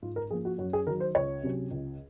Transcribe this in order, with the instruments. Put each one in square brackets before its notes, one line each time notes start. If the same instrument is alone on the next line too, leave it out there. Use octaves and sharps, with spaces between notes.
[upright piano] G#2 F4
A#4
F3 A#3 G#4
F#4
F#2 F#4
G#4
D#3 F#3 A#4
C5
C#2 C#5
C3 F#3 C#4
C#2